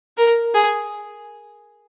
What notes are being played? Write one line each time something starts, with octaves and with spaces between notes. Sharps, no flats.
A#4
G#4